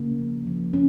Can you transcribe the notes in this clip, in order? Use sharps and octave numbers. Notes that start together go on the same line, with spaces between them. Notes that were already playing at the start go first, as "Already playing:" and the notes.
Already playing: C#3 A#3
F3
F3
C#4